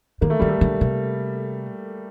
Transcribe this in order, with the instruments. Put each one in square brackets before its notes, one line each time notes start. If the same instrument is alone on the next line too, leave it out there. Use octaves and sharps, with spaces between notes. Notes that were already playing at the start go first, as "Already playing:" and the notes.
[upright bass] D#3 [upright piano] A#3
[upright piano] A3
[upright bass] D#3 [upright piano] G3
[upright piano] A3
[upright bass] D3
C3